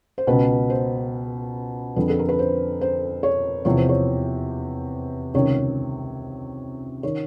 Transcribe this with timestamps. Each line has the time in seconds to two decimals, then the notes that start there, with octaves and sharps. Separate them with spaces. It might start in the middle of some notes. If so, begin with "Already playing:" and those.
0.18 C5
0.27 C#2 B2 B4
0.70 C5
1.96 F2 D3 F3 B4
2.10 A4
2.19 A#4
2.29 B4
2.39 C5
2.81 C5
3.23 C#5
3.65 E2 C3 F3 C#5
3.78 C5
3.89 C#5
5.34 C#2 C3 D#3 C#5
7.03 D#3 C#5